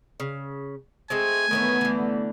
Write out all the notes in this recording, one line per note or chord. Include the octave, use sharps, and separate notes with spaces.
C#3
G#3 A3 C4 G#5
D#3 E3 A3 B3 C#5
D3 E3